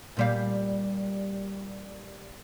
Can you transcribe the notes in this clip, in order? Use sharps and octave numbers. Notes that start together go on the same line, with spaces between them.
A#2 G3 F5